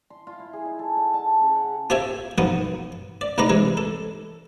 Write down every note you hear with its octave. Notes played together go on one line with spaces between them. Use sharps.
C6
F4
E4
G#4
D#4
A4
F#5
A5
C#3
F#5
F4 G4 C5 E5 G#5 A5
B1 F#2 F3 B3 D#6
D5
C2 A2 D#4 B4 D5 A#5
C3 E3 G#3
A4